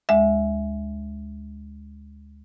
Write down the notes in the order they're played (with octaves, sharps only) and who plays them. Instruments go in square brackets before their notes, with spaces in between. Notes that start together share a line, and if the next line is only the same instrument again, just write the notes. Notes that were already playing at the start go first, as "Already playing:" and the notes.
[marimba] D2 G#3 E5